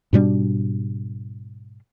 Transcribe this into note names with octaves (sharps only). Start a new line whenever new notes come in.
G#2 B2 G3 D4